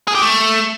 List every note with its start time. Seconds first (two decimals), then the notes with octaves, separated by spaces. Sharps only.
0.08 G#4
0.15 G4
0.22 A3